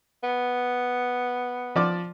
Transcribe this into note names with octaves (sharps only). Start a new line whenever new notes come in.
B3
F3 D5 D6